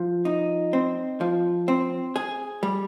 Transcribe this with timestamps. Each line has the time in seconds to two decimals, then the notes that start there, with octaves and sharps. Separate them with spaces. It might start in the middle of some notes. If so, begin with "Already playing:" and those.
Already playing: F3
0.25 D#4
0.73 C4
1.21 F3
1.68 C4
2.16 G#4
2.63 G3